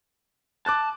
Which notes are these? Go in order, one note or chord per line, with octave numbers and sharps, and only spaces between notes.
A5 D6 F#6 A6